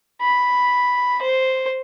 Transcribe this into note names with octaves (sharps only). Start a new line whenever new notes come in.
B5
C5